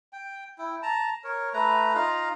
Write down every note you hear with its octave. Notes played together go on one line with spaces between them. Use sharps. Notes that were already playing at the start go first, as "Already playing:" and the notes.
G5
E4 G5
A5 A#5
A#4 C#5
A3 B4 A#5
D#4 F4 F5 A#5